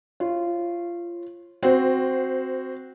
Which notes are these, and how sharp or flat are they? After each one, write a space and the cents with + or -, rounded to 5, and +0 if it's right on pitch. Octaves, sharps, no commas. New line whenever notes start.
F4 -20 C#5 -35
C4 +0 F#4 +0 C5 -20